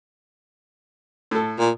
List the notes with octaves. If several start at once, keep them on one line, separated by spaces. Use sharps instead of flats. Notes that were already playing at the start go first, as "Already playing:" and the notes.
A2 A4
A#2